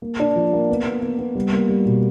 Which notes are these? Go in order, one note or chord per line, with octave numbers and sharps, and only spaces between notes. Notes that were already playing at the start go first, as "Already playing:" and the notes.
A#3
D4
F3
A#3
B3
B3
B3
B3
G3
A#3
G3
B2